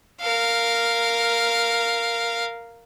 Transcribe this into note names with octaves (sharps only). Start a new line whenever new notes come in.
A#4 F5